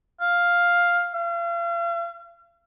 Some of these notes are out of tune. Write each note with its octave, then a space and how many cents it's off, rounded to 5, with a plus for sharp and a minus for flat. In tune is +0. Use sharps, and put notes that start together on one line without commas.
F5 +5
F5 -40